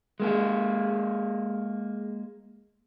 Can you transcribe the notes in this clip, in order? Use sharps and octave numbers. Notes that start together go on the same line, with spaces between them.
G#3 A#3 G#4